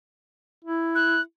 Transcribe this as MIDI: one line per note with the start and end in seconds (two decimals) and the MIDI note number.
0.65 1.21 64
0.95 1.21 90